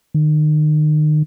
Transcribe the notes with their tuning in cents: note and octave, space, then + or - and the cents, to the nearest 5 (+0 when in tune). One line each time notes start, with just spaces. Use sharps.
D#3 -35